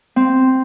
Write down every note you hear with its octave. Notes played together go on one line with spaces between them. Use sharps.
C4